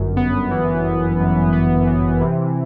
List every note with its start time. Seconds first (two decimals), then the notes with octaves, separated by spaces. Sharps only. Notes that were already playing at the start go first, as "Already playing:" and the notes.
Already playing: G1 F#2
0.17 B3
0.51 E3
0.85 G1
1.20 F#2
1.53 B3
1.87 E3
2.21 C3